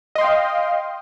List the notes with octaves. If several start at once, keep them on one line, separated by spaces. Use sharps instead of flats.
D#5 F5 G5 C6